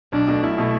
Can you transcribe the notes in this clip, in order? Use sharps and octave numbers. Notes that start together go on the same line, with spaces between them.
B1 D4
B2 A3
B1 E4
B2 A3